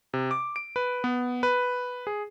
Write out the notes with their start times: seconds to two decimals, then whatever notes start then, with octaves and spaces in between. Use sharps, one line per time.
0.14 C3
0.31 D6
0.56 D7
0.76 B4
1.04 B3
1.43 B4
2.07 G#4